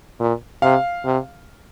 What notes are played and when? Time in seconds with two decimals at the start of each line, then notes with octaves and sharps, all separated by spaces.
0.20 A#2
0.62 C3 F5
1.05 C3